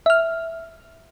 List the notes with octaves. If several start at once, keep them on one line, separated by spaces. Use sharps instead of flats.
E5 F6